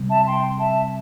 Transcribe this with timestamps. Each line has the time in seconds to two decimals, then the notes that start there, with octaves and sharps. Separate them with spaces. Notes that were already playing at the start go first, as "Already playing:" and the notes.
Already playing: C3 G3 C4
0.09 E5 A5
0.26 G5 C6
0.59 E5 A5